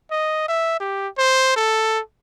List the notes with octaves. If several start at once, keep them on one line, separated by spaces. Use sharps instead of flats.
D#5
E5
G4
C5
A4